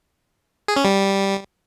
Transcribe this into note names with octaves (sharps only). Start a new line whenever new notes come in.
G#4
C#4
G3